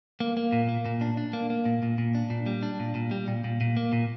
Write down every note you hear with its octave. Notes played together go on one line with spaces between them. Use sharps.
A#3
A#3
A#2
A#3
A#2
D4
D4
A#3
A#3
A#2
A#2
A#2
D4
A#2
G3
D4
A#2
A#2
G3
A#2
A#2
A#2
A#3
A#2